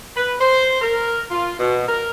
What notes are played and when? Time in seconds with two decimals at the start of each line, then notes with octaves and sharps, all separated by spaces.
0.17 B4
0.41 C5
0.82 A#4
1.31 F4
1.59 B2
1.88 A#4